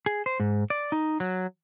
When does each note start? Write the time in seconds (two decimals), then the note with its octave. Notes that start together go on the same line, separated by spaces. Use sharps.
0.06 G#4
0.26 C5
0.40 G#2
0.70 D5
0.92 D#4
1.20 F#3